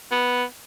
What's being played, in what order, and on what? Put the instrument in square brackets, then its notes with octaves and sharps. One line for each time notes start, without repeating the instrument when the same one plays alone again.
[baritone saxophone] B3